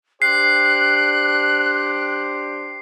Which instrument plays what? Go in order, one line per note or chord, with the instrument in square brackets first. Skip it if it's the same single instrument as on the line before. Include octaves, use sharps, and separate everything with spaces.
[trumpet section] D4 G4 C5 [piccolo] F#6 [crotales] C7